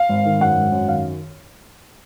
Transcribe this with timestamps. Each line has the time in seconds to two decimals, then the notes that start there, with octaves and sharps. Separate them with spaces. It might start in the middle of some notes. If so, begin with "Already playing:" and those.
Already playing: F5
0.09 G#1
0.25 D#3
0.40 F#2 F#5
0.57 G#1
0.72 F#2
0.88 D#3 F5